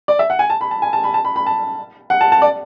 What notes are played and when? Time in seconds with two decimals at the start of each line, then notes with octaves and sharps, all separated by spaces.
0.08 D5
0.19 E5
0.30 F#5
0.39 G#5
0.50 A5
0.61 B5
0.71 A5
0.82 G#5
0.93 A5
1.04 B5
1.14 A5
1.25 B5
1.36 B5
1.47 A5
2.10 F#5
2.21 A5
2.32 A5
2.42 D5